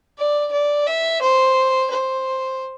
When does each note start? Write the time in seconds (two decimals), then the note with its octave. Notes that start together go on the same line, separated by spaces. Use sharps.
0.18 D5
0.52 D5
0.86 E5
1.21 C5
1.90 C5